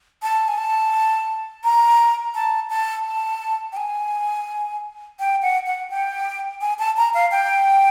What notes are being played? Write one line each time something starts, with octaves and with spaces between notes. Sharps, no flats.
A5
G#5
A5
A#5
A5
A5
A5
G5
G#5
G5
F#5
F#5
G5
G#5
A5
A#5
F5
G5